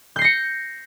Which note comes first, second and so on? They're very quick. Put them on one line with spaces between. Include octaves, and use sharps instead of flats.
G6 C7 A#6 C#7